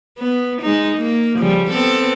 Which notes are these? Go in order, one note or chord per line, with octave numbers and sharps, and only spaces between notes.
B3
G#3 D#4
A#3
C#3 F3 G3
B3 C4 A4